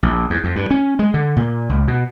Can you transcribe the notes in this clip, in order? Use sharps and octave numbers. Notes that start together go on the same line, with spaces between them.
A#1
E2
F2
G2
C#4
G#3
D3
A#2
C#2
B2